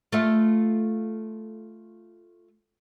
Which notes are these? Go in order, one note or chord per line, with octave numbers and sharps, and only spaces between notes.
A3 F4 E5